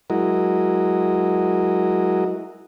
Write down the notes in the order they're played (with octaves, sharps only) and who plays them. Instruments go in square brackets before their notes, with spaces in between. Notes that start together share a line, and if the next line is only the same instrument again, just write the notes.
[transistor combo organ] F#3 G#3 E4 F#4 A#4 D#5